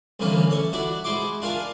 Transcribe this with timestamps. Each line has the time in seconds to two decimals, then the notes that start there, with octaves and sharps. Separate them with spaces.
0.20 C2 A2 D3 E3 A#3 C#4
0.50 A4 C#5
0.73 D4 E4 F#4 D5
1.04 G#2 E4 F#4 C6 D6
1.42 D4 F4 A#4 G#5 A5